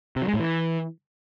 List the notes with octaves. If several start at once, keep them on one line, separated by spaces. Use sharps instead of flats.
C3
F#3
G#3
A2
E3